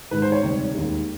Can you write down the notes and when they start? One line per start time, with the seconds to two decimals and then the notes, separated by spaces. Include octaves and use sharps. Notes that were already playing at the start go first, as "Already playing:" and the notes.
0.11 G#2 D#3 G#3 B4
0.22 C5
0.32 C#5
0.42 D2 C3 D#3 G3
0.74 D#2 D#3 G#3